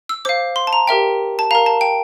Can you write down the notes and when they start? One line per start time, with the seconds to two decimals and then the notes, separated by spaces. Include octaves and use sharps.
0.09 E6
0.25 C5 F5 D6
0.56 C6
0.67 A5
0.73 A#5
0.87 G4 A#4 E5 G5
1.39 A5
1.51 A#4 F5 A#5
1.66 A5
1.81 G5